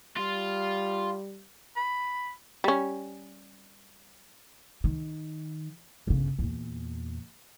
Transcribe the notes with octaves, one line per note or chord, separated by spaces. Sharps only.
G3 F4
B5
G3 C#4
D#3
G1 C#3
E2 A#2